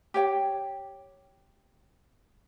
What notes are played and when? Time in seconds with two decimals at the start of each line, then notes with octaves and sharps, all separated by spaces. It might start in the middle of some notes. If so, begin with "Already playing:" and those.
0.14 G4 C#5 G5